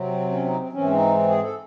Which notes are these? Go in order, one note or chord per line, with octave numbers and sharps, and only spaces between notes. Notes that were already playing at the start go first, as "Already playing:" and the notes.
Already playing: C3 F#3 C4
C#4
D#4
C4
G#2 E3 C4 C#4
D#4
G#4
A4